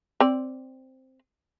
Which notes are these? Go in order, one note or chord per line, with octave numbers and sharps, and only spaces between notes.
C4 D5